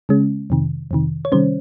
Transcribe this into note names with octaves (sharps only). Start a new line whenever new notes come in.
C#3 G#3 C#4
F2 C3 D#3
F2 C3 D#3
C#5
C3 D#3 G3 C#4 C5